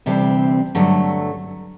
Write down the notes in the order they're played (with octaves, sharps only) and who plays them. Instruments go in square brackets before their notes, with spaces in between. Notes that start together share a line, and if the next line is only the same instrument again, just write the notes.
[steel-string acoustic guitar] D2 C3 E3 G3 C4
G2 D3 F#3 A3